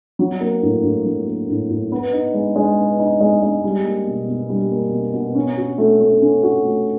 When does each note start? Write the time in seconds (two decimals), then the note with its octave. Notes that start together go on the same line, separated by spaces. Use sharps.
0.19 F#3
0.41 A#3
0.63 A2
0.83 A2
1.05 F#3
1.27 A#3
1.49 A2
1.70 A2
1.92 B3
2.13 D#4
2.34 G#3
2.56 G#3
2.78 B3
2.99 D#4
3.20 G#3
3.42 G#3
3.64 G3
3.84 A#3
4.07 B2
4.28 B2
4.49 G3
4.71 A#3
4.92 B2
5.13 B2
5.35 C#4
5.57 F#4
5.78 A3
6.00 A3
6.22 C#4
6.43 F#4
6.64 A3